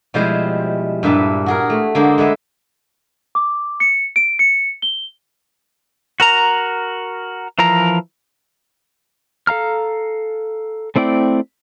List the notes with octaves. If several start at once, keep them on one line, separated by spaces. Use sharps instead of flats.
B2 F3 G3 G#3 E4 C5
G2 A#2 B4 E5 A5
F#4 G#4 A#4
A3
D3 G#3 A#3 G#4 A4 C5
G#3 A4 B4 E5
D6
C#7
D7
C#7
G7
F#4 A#4 A#5
E3 F3 A#4 A#5
A4 F5 A#5 F6
A3 C4 E4 D5 G5